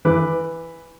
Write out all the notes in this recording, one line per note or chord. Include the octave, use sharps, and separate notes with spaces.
E3 B4 D6